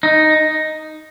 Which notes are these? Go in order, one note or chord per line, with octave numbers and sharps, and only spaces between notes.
D#4